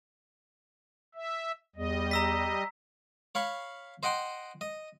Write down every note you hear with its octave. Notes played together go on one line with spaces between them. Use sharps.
E5
E2 G3 D#5
A#5 E6 B6
C#5 F5 B5 C#6
C5 D#5 F#5 G5 C6
D#5